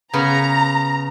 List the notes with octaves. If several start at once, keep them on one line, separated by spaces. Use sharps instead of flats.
C#3 B3 A#5